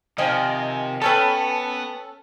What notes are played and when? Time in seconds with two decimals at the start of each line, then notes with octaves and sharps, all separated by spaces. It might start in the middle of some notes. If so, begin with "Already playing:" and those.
0.18 C3 D#3 F3 D#5 G5 G#5
1.02 B3 C#4 A4 B4 G5 A5